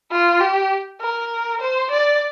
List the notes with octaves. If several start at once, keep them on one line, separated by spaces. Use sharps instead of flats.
F4
G4
A#4
C5
D5